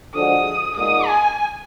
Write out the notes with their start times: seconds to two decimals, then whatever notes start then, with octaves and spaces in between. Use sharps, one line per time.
0.14 D3 F3 G#3 D4 F#4 D#6
0.77 A#2 G#3 D#4 F#4 D#6
1.07 G#5